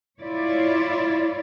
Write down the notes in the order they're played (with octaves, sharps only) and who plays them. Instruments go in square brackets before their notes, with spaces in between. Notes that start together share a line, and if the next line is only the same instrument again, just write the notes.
[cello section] E4 F4 C#5 D5